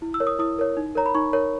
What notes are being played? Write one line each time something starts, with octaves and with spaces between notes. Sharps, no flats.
E4
E6
A#4 C#5
D#6
E4 D#6
A#4 C#5
D#4
A#4 C#5 A#5
B5
D#4 C#6
A#4 C#5